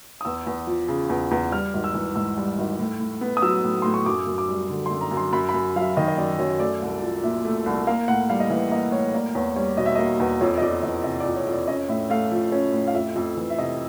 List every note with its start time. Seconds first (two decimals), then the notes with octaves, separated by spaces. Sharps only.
0.21 D#6
0.25 E2 E6
0.47 E2
0.67 F3
0.88 C#3
1.09 E2
1.31 E2
1.52 G3 F6
1.74 G#1
1.84 E6
1.94 E3
2.15 G#2 E6
2.37 G3
2.58 G#1
2.79 A2
3.00 A2
3.21 B3
3.37 D#6
3.42 F#3 E6
3.64 A2
3.82 A2 C6
3.94 C#6
4.06 F#2 D6
4.27 F#2
4.38 D6
4.49 G3
4.69 D3
4.86 C6
4.91 F#2
5.01 A#5
5.11 F#2
5.17 C6
5.33 F#2 B5
5.49 B5
5.54 F#2
5.76 F#3 F5
5.81 E5
5.97 D#3 D#5
6.08 D#5
6.18 F#2 D5
6.39 F#2 C#5
6.59 A3 D5
6.82 C2
7.02 F3
7.23 A#2 E5
7.45 A3
7.66 C2
7.87 A#3 F5
8.08 A2 F#5
8.29 G3 F5
8.40 D#5
8.50 E3 E5
8.71 A#3 D#5
8.92 A2 C#5
9.13 A#3 D5
9.35 E2 C#5
9.56 G3 C#5
9.77 B2 D#5
9.86 E5
9.95 A#3 D#5
10.20 E2
10.41 F2 C#5
10.58 D#5
10.62 F2 D5
10.83 E3 D#5
11.04 C3 D#5
11.20 D5
11.26 F2
11.36 C#5
11.47 F2
11.52 D5
11.68 C#4 D#5
11.89 A2 E5
12.10 A3 F5
12.32 F3
12.52 C#4
12.73 A2
12.88 F5
12.94 F2 E5
13.16 F2
13.37 E3
13.50 E5
13.59 C3 D#5